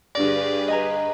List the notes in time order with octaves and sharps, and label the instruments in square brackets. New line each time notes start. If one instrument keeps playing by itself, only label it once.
[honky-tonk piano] G2 D3 A#6 [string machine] G4 G#4 B4 [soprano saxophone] D5
[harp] D#5 G#5 A#5